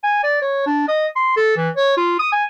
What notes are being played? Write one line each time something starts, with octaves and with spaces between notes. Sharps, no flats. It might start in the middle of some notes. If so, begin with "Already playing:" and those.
G#5
D5
C#5
D4
D#5
C6
A4
E3
C#5
F4
D#6
G#5